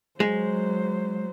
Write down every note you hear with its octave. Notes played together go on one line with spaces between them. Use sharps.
F#3 G#3 C5